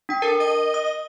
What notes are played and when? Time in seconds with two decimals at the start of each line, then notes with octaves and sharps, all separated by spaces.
0.09 D4 G5
0.22 A4 A#4
0.40 D#5
0.74 D#6